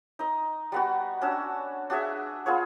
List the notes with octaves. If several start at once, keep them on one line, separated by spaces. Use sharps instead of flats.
D#4 D#5
G3 B3 F#4
C#4 D4 F#4 E6
D4 F#4 G#4 E5
B3 F4 G#4 C#5